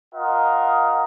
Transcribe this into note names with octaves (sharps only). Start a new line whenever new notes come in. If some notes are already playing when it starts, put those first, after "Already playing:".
F4 A#4 D#5 F#5